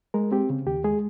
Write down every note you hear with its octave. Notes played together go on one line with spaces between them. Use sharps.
G#3 A#4
C4 G4
C#3
D#2 G4
G#3 G#4